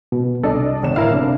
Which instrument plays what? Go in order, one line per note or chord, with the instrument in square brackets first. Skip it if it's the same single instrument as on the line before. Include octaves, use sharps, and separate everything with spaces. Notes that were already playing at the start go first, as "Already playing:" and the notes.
[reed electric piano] B2
[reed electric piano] C2 A4 [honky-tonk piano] D4 D5 D#5
[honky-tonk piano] G1 E7
[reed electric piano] A2 E4 A#4 [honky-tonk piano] F5
[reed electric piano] C3 [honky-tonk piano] D4